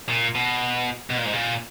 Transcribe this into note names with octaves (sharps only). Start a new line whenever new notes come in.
A#2
B2
B2
A#2
G#2
A#2